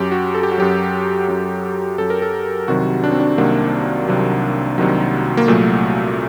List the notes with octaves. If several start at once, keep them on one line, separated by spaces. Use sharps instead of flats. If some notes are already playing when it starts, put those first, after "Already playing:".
Already playing: F#2 F#3 G4
F#4
A4
G4
F#4
F#2 F#3 G4
F#2 F#3
F#2 F#3 A4
A#4
A4
C2 C3 D#3 F#3 F#4
D4
C4
D4
C2 C3 D#3 F#3 A#3
C2 C3 D#3 F#3
C2 C3 D#3 F#3
A#3
C2 A#2 F#3 A3